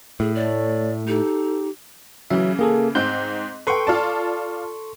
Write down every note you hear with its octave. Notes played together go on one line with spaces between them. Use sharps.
A2 G#4
A3 C#5 D5
D#4 G4 A4
C#3 E3 F#3 E5
A#3 G#4 A4
G#2 C4 F#6 G6
A4 B4 G5 C6 C#6
F4 D5 A5